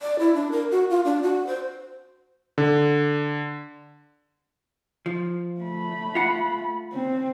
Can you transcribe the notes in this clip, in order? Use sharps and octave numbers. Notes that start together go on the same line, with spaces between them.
D5
E4
D4
A#4
F#4
F4
D4
F#4
C5
D3
F3
A3 B5
F4 F#5
C4